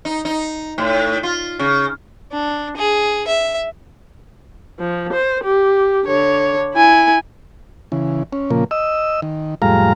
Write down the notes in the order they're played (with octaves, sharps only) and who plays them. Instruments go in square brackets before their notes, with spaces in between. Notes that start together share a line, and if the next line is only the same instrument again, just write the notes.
[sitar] D#4
D#4
A2
F4
C#3
[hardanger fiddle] D4
G#4
E5
[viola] F3
C5
G4
D3 C#5
E4 G#5
[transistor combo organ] C#3 E3
C#4
A#2 C#3 F3 A#3
D#5 E6
D#3
F2 A2 G3 G#3 F5 A#5